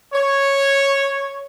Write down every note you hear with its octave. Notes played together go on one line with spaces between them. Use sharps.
C#5